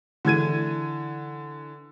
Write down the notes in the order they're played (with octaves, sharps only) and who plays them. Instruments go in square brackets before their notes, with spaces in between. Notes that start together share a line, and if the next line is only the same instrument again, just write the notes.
[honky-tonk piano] D3 E3 G#6 D#7